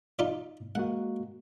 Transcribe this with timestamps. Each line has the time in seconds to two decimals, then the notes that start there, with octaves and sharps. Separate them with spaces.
0.19 D#4 F4 D5
0.75 G#3 A#3 F#4 F#5